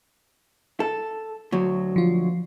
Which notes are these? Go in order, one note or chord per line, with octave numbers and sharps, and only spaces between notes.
A4
D2 F#3
F3 F4